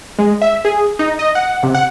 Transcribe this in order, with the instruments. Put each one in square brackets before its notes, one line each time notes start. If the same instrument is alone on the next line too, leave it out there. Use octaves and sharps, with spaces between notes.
[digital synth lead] G#3
E5
G#4
D#4
D#5
F#5
C3
F#5